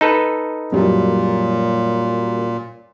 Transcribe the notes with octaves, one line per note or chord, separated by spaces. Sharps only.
D#4 A4 B4
F#2 A#2 G3